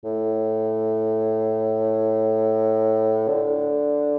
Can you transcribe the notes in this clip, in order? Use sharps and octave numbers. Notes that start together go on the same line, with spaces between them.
A2
D3